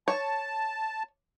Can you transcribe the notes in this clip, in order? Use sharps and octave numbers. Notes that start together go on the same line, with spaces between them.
C#5 A5